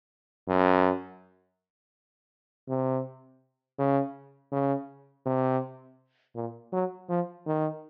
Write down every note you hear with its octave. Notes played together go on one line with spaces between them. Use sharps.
F#2
C3
C#3
C#3
C3
A#2
F#3
F3
D#3